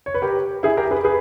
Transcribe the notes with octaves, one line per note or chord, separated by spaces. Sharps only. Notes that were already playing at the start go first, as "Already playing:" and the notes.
C#5
B4
G4 A#4
E4 G#4
G4 A#4
G#4 B4
G#4 B4